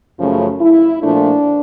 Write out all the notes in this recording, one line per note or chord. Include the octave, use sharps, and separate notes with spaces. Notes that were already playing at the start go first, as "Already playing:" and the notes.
F#2 C#3 F3 A3
E4
A#2 F3 A3 D4